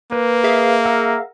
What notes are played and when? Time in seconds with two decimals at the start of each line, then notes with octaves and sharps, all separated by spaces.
0.12 A#3 B4
0.44 G#4 E5 F5
0.85 A#4 F#5 E6